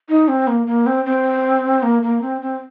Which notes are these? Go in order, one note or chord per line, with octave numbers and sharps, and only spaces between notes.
D#4
C4
A#3
A#3
C4
C4
A#3
A#3
C4
C4